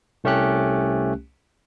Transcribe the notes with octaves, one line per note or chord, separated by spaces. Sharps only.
C2 A3 C#4 G4 F#6